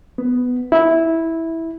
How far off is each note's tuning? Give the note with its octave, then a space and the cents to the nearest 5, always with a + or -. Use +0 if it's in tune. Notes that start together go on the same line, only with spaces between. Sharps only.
B3 +10
E4 -10